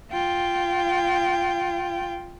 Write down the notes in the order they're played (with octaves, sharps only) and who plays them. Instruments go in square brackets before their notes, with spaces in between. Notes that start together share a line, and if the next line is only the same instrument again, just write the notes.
[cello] F4 G5